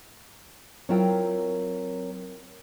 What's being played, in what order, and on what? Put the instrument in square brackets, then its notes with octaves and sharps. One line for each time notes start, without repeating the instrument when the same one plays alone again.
[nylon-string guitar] F#3 C4 E4 F4 A#4 G5